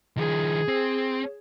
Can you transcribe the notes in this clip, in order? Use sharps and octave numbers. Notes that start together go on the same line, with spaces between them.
D#3 F3 G#4
C4